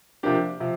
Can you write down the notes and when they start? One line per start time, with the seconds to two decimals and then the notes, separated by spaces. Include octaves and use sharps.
0.23 C3 F3 A#3 D4 G4
0.60 C3 F3